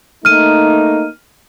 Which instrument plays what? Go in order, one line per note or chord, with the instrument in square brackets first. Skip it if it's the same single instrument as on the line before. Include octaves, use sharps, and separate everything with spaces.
[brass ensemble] A3 A#3 D#4 [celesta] F6 D#7